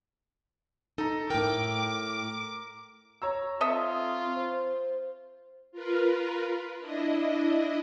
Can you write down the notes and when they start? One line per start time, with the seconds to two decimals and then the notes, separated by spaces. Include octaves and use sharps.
0.98 D#4 A4 A#5
1.30 A2 A#4 G5 D6
3.22 C#5 A#5 E6
3.61 C4 F4 A4 D#5 E5
4.36 C5
5.71 F4 A#4 B4
6.79 D4 E4 D#5